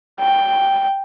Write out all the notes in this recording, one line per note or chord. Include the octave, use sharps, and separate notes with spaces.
G5